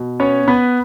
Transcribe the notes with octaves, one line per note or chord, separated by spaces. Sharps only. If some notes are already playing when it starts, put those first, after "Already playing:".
Already playing: B2
B3 C#4 C#5
B3 B4